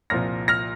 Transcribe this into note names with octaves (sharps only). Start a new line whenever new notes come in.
C2 A#2 F3 F6 A#6
F6 A#6